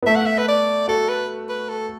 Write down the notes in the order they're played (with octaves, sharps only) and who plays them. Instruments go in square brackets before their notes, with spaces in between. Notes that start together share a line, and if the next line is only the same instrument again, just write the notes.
[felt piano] B3
[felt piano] A3 [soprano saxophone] E5
[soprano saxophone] F#5
E5
B4
D5
[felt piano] F#4 [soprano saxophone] A4
[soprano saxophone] B4
B4
A4